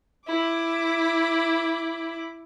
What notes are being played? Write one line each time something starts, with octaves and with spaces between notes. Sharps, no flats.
E4 D6